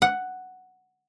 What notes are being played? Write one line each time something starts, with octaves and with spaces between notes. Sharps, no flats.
F#5